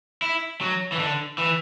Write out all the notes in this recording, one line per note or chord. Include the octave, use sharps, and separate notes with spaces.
E4
F#3
E3
D3
E3